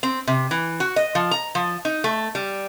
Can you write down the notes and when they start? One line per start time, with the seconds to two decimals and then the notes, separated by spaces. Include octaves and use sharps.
0.03 C4
0.27 C3
0.51 E3
0.80 F#4
0.96 D#5
1.15 F3
1.31 A#5
1.55 F3
1.85 D#4
2.04 A3
2.35 G3